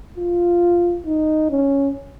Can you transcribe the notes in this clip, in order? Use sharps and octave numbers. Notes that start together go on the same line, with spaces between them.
F4
D#4
C#4